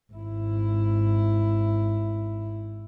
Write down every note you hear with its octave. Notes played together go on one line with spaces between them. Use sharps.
G#1 E4